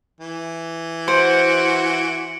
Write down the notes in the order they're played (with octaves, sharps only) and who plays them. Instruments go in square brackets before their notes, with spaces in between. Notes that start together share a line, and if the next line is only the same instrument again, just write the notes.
[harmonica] E3
[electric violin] F#4 F#5 [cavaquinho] C5 [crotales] C#7 D7 F#7